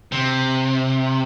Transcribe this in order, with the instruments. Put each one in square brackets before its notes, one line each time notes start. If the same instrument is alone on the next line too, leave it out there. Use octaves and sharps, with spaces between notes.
[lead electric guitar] C3